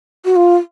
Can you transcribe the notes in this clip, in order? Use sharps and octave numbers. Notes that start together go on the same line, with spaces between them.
F#4
F4